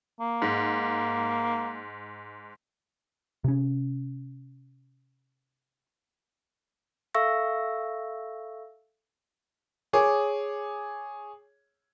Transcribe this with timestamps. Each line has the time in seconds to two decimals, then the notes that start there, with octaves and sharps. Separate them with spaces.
0.20 A#3
0.42 G#2
3.44 C3 C#4
7.15 A4 E5 F5 C#6 E6 A#6
9.93 G#4 C#5 D6